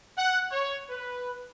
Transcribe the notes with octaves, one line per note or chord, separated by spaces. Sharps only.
F#5
C#5
B4